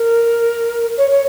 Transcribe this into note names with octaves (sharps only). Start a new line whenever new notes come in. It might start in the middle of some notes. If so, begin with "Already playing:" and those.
Already playing: A#4
C#5
C#5